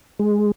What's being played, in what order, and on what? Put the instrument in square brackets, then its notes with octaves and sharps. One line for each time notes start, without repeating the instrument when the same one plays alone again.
[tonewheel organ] G#3